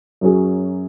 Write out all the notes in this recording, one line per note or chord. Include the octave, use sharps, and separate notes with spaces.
F#2 F#3 C#4 G#4